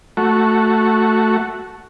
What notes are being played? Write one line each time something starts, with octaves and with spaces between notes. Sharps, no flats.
A3 F#4